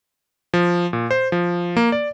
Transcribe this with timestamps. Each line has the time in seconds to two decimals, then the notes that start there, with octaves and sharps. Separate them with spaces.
0.54 F3
0.93 A#2
1.11 C5
1.32 F3
1.77 A#3
1.92 D5